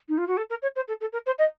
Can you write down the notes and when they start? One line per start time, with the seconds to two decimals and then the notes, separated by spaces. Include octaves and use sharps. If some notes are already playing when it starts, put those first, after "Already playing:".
0.08 D#4
0.17 F4
0.27 F#4
0.37 A4
0.50 A#4
0.62 C#5
0.76 C5
0.88 A4
1.01 A4
1.12 A#4
1.26 C5
1.38 D#5